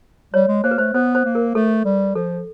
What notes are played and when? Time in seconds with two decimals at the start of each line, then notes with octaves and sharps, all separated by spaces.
0.34 G3 C#5
0.48 G#3
0.64 A#3 C5
0.71 B4
0.78 A3 C5
0.94 B3 C5
1.15 C5
1.25 A#3
1.35 A#4
1.55 A3 A4
1.85 G3
2.15 F3 A4